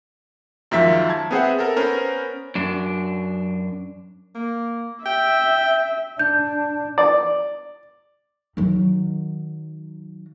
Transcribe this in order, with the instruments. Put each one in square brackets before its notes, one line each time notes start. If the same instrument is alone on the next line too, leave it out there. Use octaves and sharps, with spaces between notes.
[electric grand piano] F#2 D#3 F3 G#3 E5 B6
A5 G#6
B3 C4 G#4 C5 E5 F#5
A4 A#4
B3 C#4 A#4 C5
[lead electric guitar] F#2 D4
[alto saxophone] A#3
[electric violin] E5 [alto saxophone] G5
[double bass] D4 [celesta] G6
[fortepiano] D5
[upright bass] D#3 F#3